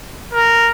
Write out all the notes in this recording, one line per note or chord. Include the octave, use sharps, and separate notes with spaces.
A#4